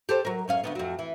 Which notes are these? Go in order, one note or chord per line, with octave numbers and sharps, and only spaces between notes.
G4 A4 C5
F#3 A#4
F#2 C#4 F5
D2 G2 B3
F2 F#3
E3